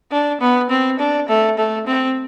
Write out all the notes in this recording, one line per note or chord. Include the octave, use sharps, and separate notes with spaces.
D4
B3
C4
D4
A3
A3
C4